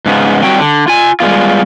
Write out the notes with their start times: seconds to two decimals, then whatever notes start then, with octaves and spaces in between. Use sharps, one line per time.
0.06 G#2 C#3 B3
0.44 F#3 G3 C4 F#4 G5
0.58 D3
0.88 F4 G#5
1.20 G3 G#3 B3 F4